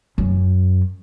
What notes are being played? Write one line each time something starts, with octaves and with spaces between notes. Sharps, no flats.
F#2